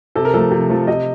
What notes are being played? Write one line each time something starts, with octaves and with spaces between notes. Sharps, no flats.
C3 A4
A#4
F3 A3 A4
C3
F3 A3
C3 D#5